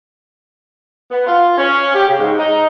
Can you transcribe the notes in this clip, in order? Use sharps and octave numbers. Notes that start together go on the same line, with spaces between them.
B3
F4
C#4
G4
C#3
G#2
D#4